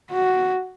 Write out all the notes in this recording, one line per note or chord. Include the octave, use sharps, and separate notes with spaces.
F#4